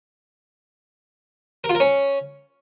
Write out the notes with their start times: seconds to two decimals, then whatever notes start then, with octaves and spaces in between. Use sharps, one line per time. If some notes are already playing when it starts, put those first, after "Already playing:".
1.64 A#4
1.69 F4
1.75 A#4
1.80 C#4